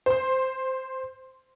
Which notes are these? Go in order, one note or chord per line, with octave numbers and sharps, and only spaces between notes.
C5 C6